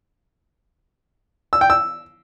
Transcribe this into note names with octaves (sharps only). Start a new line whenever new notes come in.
E6
G5
E6